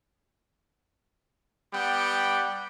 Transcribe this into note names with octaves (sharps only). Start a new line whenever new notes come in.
G3 B3 F#5 G5 B5 D6